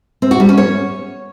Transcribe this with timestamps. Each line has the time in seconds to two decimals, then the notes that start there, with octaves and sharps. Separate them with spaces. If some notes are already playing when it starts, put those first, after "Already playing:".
0.22 C4
0.31 F#4
0.40 G3
0.49 C#4
0.58 C#5